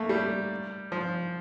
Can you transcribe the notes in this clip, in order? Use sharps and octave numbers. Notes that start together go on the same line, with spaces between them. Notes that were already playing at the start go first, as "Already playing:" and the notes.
Already playing: A3 A#3
G3
F3